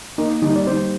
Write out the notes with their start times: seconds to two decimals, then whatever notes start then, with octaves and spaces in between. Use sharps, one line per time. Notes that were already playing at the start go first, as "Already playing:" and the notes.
0.18 A#3 D#4
0.42 G3 D#4
0.56 D5
0.67 G3 C5